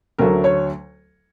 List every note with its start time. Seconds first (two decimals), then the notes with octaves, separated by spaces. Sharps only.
0.18 D2 D3 F#3 A3 A#4
0.44 C#5